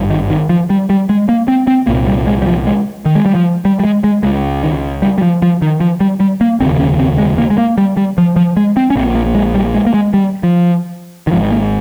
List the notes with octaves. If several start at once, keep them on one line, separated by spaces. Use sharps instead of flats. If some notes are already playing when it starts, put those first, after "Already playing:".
Already playing: G#1 G2
D#3
D#3
F3
G3
G3
G#3
A#3
C4
C4
C2 A#2 A#3
G3
G#3
G3
F3
G#3
D#3
G#3
G3
F3
G3
G3
G#3
G#3
C#2 C#3 G#3
D#3
G3
G3
F3
F3
D#3
F3
G3
G3
A#3
F1 D#2 C#3 C4
C#4
C4
G#3
A#3
G#3
A#3
G3
G3
F3
F3
G#3
C4
C#4
A#1 A#2 C4
A#3
G#3
G3
G#3
A#3
G#3
G3
F3
D#3
G#1 G#2 F3
A#3